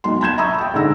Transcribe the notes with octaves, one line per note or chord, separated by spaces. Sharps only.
B1 C6
A5 B5 G6 G#6 E7
E5 A#5 B5 C#6 D#6 E6
G5 A5
G#2 D3 E6 A#6